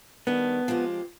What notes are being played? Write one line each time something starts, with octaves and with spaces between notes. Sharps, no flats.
D#3 G3 B3 D4 G#4
F3 G#3 C4 G4